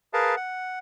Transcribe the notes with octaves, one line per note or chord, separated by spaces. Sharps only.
G#4 A#4 B4 F5 A5
F#5